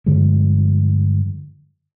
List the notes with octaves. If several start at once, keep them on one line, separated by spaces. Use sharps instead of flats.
G2 D3 F3 G#3